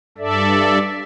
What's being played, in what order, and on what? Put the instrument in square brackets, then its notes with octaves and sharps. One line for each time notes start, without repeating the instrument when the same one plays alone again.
[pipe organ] G2 A4 D5 E5